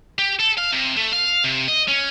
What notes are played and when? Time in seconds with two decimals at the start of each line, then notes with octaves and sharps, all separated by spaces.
0.19 G4
0.40 A4
0.58 F5
0.73 C3
0.97 A3
1.13 F5
1.44 C3
1.68 D#5
1.88 C#4